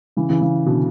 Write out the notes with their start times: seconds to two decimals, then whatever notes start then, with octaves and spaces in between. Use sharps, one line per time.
0.17 C#3 E3
0.30 C#3 E3
0.41 C#3
0.66 B2 D3